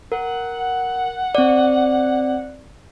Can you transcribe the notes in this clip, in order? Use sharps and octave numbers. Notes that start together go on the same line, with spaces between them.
A#4 F#5
C4 D5